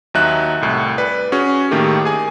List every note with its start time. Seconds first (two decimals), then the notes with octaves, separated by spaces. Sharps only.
0.14 D#2 F#3 D#4 E5 F#6
0.61 C2 A2
0.98 B4 D5
1.32 C#4 F#4 G#4
1.71 A2 D#3 A3 A#3 G4
2.05 G#4 G#5